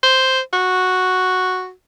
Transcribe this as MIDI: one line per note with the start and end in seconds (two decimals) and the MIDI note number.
0.03 0.40 72
0.53 1.71 66